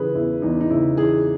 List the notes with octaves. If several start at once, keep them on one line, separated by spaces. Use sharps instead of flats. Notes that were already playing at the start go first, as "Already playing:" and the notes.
Already playing: C#3 E3 G#4 B4
E2 E4
E2 D#4
D#4
C#3 E4
E3 G#4